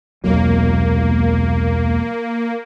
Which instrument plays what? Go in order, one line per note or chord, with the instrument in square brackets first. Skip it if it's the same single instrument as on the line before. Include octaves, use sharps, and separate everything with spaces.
[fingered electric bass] E1 C2 F#3 [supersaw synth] A#3